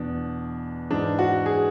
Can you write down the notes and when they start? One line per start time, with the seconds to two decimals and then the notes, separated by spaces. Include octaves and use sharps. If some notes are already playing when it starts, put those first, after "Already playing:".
Already playing: E2 B2 D4
0.91 G#2 E3 D4
1.19 F#4
1.46 G#4